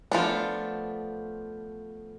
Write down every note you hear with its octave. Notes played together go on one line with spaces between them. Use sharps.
F3 A3 B3 D4 F4